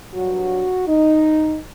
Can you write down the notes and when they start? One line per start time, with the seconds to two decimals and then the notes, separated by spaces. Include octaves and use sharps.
0.13 G2 F#3 F#4
0.87 D#4